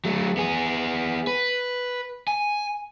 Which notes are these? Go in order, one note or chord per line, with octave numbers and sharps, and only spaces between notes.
F#3 A3
B3 G#4
B4
G#5